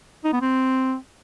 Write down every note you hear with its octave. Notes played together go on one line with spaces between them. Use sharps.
D#4
B3
C4